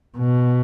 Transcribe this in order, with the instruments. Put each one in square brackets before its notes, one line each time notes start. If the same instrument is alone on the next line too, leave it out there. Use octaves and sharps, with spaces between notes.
[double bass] B2